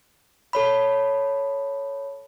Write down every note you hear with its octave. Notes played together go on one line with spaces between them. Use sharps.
A4 C#5 B5